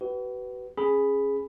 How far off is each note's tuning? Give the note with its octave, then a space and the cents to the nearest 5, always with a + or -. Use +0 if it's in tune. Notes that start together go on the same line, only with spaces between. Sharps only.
F#4 +45 B4 +5
C#4 -15 G#4 +0 B5 +0